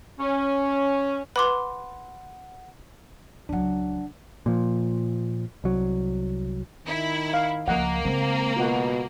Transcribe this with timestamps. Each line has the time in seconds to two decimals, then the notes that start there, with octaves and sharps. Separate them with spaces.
0.19 C#4
1.36 B4 F#5 B5 C6 D6
3.49 C#2 F#3 D4 F#5
4.46 A#2 F3
5.64 C2 F#3
6.86 D#3 E4
7.34 F5
7.68 C#2 F3 A#3 D#5 F#5
8.05 C#3 G#3 C4
8.56 B2 F4 F#4 F#5